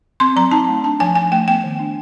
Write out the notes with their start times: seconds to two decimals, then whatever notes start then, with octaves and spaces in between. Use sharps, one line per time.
0.20 C4 C6
0.36 F#3 A#5
0.51 D#4 A5
0.68 A3
0.84 D4 A5
1.00 F3 G#5
1.15 F3 G#5
1.32 A3 G5
1.48 B3 G5
1.64 D#3
1.79 D4